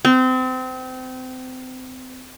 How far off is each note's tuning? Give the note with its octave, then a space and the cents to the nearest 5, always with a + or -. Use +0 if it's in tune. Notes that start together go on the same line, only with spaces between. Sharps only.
C4 -30